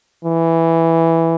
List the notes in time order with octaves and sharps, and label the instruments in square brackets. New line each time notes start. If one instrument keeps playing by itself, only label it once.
[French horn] E3